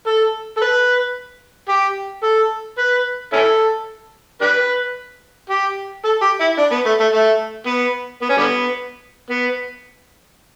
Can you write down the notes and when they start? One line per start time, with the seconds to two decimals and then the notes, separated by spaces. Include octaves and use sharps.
0.06 A4
0.57 A4
0.61 B4
1.69 G4
2.23 A4
2.78 B4
3.33 C#4 E4 A4
4.41 D4 G4 B4
5.50 G4
6.05 A4
6.22 G4
6.40 E4
6.59 D4
6.72 B3
6.86 A3
7.00 A3
7.13 A3
7.67 B3
8.22 B3
8.29 C#4
8.38 D3 G3 B3
9.30 B3